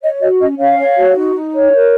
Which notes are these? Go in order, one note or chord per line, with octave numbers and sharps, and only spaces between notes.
C#5 D#5
F#4 D#5
C#4 D#5
C#4 C#5 F5
C#5
F#4
D#4
D#4
C#5
A#4